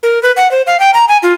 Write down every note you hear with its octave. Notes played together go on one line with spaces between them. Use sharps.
A#4
B4
F#5
C5
F5
G5
A#5
G#5
F4